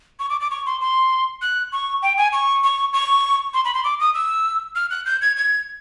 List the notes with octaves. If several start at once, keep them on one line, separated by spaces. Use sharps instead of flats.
C#6
D6
D6
C#6
C6
C6
F#6
C#6
G5
G#5
C#6
C#6
C#6
C6
B5
C6
D6
D#6
E6
F6
F#6
G6
G#6
G#6